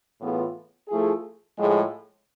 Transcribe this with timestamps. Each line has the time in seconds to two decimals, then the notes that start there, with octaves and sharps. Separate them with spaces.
0.20 A2 E3 B3 F4 G#4
0.88 F3 A3 E4 G#4
1.57 A2 F3 G#3